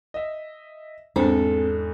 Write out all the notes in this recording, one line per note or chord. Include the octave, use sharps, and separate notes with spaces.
D#5 E5
E2 G#2 C4 D4 A4